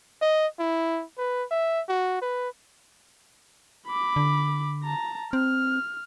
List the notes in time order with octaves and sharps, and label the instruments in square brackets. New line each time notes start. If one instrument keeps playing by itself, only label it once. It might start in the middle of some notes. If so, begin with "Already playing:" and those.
[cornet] D#5
E4
B4
E5
F#4
B4
[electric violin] B5 D6
[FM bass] D3
[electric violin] A5 A#5
[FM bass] C4 [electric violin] F6